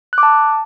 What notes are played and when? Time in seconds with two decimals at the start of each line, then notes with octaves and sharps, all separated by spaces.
0.13 F#6
0.18 D6
0.23 A5